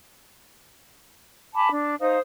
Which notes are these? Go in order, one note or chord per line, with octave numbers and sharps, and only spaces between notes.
G#5 A5 B5 D6
D4
D#4 C5 F5 D#6